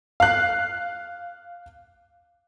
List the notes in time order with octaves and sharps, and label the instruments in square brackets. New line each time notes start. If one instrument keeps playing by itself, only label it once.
[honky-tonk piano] F5 F#6